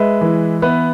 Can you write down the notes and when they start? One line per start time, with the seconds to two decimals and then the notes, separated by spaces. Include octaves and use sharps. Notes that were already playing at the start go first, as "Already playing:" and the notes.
Already playing: G#3 B4 E5
0.21 E3
0.62 B3 B4 E5